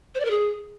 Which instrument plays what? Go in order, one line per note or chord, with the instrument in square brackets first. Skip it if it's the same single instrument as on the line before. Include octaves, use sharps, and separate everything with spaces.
[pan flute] C5
D5
A#4
G#4